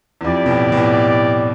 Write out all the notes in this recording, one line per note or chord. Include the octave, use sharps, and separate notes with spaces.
E2
F2 E4 G4 D5
B2
A2
B2
A2